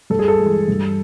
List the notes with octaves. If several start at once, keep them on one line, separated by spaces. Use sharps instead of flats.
G2 A4
G#4
A4
E3 G#3
G2